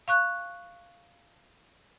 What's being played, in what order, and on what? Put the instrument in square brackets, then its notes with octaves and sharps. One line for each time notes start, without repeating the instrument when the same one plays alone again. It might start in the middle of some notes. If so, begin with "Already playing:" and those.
[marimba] F5 C#6 F#6